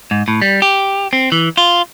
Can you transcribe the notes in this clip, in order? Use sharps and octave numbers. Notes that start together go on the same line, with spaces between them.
G#2
A2
G3
G4
C4
E3
F4